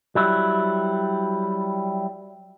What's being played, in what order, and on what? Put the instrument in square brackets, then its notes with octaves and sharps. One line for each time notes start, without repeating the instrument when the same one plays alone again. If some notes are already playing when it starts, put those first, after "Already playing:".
[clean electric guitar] F#3 G3 E4